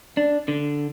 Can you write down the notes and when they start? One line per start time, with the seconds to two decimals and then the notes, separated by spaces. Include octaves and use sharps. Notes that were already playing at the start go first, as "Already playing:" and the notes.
0.17 D4
0.48 D3